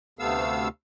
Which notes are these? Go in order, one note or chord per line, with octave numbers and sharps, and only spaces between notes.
D2 C3 A3 B3 F5 E6